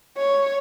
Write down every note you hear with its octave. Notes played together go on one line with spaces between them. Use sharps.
C#5